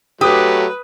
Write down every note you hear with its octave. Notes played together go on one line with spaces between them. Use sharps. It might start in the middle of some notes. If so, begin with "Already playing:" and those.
F#3 A3 G4 B4 D#6